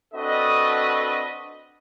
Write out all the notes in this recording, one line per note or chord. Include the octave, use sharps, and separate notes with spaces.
C4 D4 F#4 A4 B4 D#5